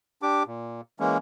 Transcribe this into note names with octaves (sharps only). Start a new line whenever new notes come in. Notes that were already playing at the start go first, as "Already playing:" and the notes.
D4 G4 D6
A#2
E3 G#3 A#3 C#4